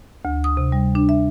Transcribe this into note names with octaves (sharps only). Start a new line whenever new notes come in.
D2
D#6
C3
G3
D4
E5